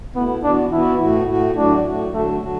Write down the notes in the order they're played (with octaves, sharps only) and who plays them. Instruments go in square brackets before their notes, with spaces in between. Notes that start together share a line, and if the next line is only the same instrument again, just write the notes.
[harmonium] B2 A3 E4 [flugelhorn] B3
[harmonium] E3 B3 F#4 [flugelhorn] D4
[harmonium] E3 B3 F#4 [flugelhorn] E4
[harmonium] A2 A3 F#4
A2 A3 F#4
[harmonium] A2 F#3 A3 F#4 [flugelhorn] D4
[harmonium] A2 F#3 A3 F#4
[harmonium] D3 F#3 D4 F#4 [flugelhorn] A3
[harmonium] D3 F#3 D4 F#4